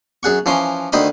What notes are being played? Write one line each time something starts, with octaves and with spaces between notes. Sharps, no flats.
F#2 G#4 F#5 C#6
E3 F3 C#4 C6
D2 D#3 C5 D#5 B5 D#6